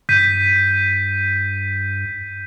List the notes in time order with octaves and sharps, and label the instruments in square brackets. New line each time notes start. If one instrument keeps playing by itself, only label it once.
[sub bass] G2 [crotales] G6 B6 D#7